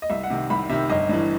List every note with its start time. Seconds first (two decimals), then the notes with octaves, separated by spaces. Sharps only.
0.02 D#5
0.10 C2 E5
0.23 F#5
0.30 C3 D#3
0.50 C2 B5
0.69 C3 D#3 E5
0.90 G1 D#5
1.09 G2 E3